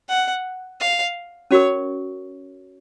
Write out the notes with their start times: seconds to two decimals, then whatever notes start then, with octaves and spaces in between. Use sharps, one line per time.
0.09 F#5
0.80 F5
1.51 C#4 F#4 A#4 C#5